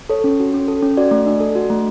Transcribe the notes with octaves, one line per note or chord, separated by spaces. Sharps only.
A4 C#5
C#4
F#4
C#4
A4
C#4
F#4 D5
A3
D4
A4
F#4
A3